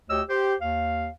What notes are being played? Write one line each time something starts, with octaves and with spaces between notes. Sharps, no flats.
D2 G4 C#5 D#5 E6
G4 C5
D#2 F5